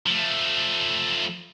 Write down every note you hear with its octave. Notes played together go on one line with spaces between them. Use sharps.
F3 A3